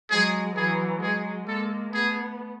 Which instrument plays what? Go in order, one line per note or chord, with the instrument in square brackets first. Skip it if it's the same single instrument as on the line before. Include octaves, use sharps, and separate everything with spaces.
[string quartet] F#3 G#3 [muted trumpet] G#4
[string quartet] E3 F#3 [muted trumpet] G#4
[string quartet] F#3 G#3 [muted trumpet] G#4
[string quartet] G#3 A#3 [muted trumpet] A4
[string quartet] A3 B3 [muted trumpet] G#4